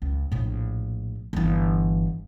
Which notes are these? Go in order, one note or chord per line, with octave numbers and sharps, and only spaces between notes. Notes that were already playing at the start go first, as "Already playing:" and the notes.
C#2
A#1 A2
G1 E3